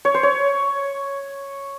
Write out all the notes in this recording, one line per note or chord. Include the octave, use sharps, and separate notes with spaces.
C#5
C5
C#5